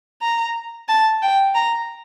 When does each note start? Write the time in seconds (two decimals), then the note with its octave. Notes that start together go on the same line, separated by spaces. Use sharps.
0.22 A#5
0.89 A5
1.22 G5
1.55 A#5